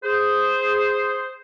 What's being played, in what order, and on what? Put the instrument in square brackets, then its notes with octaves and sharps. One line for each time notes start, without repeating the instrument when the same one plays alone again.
[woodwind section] G#4 C5